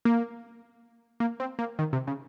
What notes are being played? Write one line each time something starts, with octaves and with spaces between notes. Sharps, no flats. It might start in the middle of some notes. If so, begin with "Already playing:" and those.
A#3
A#3
C4
A#3
D#3
C3
C#3